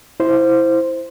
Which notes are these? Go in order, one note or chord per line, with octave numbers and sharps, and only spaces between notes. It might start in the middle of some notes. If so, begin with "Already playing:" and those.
E4 C5